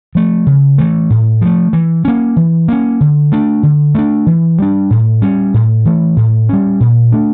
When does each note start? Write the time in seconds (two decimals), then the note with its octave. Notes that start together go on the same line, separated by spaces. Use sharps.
0.15 F3 A3
0.47 C#3
0.78 E3 A3
1.10 A2
1.41 F3 A3
1.73 E3
2.05 A#3 C#4
2.36 E3
2.68 A#3 C#4
3.01 D3
3.32 A3 D4
3.63 D3
3.95 A3 D4
4.26 E3
4.59 G3 D4
4.91 A2
5.22 G3 C#4
5.54 A2
5.85 E3 A3
6.17 A2
6.49 G3 C#4
6.80 A#2
7.12 A3 D4